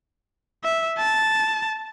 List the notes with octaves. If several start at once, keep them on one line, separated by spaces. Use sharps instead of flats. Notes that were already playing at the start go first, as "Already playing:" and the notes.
E5
A5